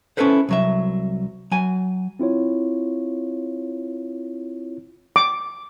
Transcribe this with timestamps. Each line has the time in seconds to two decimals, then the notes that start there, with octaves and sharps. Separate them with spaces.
0.17 C#4 D#4 E4 A4 B4 C5
0.49 C2 F#3 E5
1.51 F#3 G#5
2.20 C4 E4 F4 C#5
5.16 D6